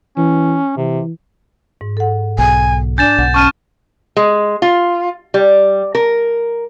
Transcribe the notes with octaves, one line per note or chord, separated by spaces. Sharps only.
E3 C#4
C3 E3
G#2
A4 F#5
B1 G#5
D4 G#5 G6 A6 E7
B1 F#5
C#4 A5 C#6 F6 D#7
G#3
F4
G3
A#4